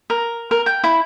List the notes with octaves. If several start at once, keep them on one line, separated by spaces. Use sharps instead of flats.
A#4
A#4
G5
E4